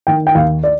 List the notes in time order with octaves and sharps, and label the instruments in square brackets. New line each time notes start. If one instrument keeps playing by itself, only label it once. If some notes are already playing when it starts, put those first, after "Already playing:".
[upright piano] D#3 G5
G5
D#2 F5
D5